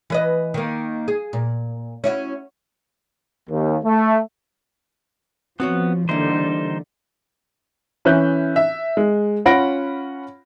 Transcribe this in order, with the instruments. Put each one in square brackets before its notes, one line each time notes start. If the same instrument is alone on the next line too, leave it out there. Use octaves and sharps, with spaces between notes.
[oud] E3 B4 D#5
D#3 A#3
G#4
A#2
C#4 E4 F#4
[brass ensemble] D#2
A3
[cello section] F3 [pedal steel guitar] B3 [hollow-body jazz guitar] C4 F#4 C#5
[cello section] D3 [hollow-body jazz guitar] E3 A#3 [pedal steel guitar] G3 D#4 C5
[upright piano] E3 C#4 E5 F#6 G6
E5
G#3
C#4 F4 F#5 B5 A#6 D7